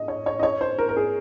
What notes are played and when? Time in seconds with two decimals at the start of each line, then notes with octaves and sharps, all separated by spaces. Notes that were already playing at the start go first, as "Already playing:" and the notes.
Already playing: D#5
0.08 C#5
0.26 C#5
0.39 D#5
0.43 C#5
0.61 C5
0.78 A#4
0.89 A#4
0.96 G#4